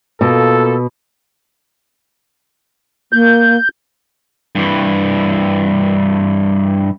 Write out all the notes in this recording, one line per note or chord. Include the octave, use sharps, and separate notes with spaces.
B2 A#3 F4 A4
A#3 G6
G2 E3